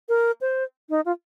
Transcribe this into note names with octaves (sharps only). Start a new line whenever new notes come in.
A#4
C5
D#4
F4